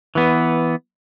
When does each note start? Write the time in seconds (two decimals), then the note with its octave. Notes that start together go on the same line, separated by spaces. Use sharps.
0.15 E3 B3